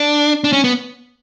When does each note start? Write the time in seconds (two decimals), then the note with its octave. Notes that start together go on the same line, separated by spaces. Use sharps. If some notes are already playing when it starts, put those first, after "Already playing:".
Already playing: D4
0.44 D4
0.53 C#4
0.64 B3